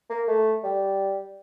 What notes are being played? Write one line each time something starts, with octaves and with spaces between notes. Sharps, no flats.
A#3
A3
G3